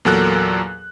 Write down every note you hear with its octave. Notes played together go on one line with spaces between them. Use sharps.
E2 A#2 F#3 A4 A#4 F#6